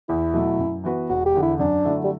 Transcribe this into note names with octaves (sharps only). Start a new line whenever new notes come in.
E2 E4
B2 F#3 A3
F#2
E3 B3 F#4 B4
E1 F#4
G4
E2 D3
E4
F#2 D4
D3 F#3 A3 E4
G3